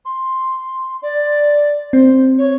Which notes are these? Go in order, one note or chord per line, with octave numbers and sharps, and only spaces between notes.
C6
D5
C4 C5
C#5